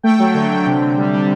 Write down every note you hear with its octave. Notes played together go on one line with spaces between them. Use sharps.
A3 G5
F#3
D3
D3
C3
C3
G3
G3